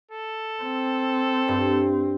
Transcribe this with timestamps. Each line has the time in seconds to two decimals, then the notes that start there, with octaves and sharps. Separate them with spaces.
0.11 A4
0.63 C4
1.48 G2